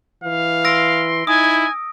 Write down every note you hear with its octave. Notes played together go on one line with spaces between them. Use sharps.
E3 F5
C6 E6 A#6 D7
D#4 E4 G#5 D#6